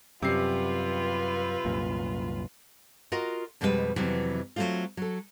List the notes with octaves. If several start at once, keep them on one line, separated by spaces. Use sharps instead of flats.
F#2 C3 G3 F4 B4 C7
C2 F#2 A#2
F4 F#4 A#4 D#5
F2 B2 G3 G#3 F#4 B4
F2 C3 E3 F#3 B3
F#3 G#3 A3 C4 F4
F#3 A4